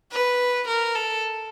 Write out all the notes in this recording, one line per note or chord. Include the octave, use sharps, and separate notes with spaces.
B4
A#4
A4